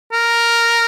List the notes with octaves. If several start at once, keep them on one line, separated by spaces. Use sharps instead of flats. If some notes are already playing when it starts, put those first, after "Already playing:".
A#4